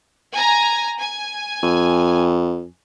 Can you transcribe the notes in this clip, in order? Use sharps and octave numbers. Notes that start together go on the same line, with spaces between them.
G#5 A#5
G#5
F2